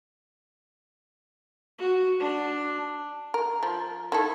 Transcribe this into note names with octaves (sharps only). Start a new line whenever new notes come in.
F#4
D4
A#4
F3
D#3 E4 A4